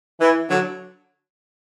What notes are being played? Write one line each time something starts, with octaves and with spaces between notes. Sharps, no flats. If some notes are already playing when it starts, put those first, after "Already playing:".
E3
D3 F#3